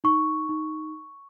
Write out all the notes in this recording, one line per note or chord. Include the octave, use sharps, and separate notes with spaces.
D#4 C#6
D#4